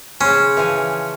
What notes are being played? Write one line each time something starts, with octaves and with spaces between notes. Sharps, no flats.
C#3 C#4 C5
E3 F3 G#5